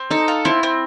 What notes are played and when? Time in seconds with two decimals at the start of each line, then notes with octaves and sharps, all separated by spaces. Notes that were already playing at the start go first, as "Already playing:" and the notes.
Already playing: C4
0.10 D#4 A4
0.28 F4
0.45 C4 E4
0.63 C4